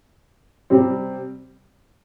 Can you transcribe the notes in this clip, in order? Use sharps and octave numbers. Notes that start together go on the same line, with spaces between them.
C3 G3 C4